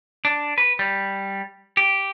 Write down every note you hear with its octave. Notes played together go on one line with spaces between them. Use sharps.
D4
B4
G3
G4